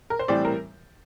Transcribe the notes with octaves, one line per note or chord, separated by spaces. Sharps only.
A#4
C5
A2 E3 G3 C4 D5
A#4